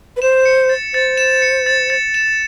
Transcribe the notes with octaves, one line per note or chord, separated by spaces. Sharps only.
B4
C5 E7
C#7
A6
C5 A6
E7
C#7
A6
A6
E7